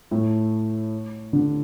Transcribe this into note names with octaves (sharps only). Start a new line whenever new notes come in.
A2 A3
D3 D4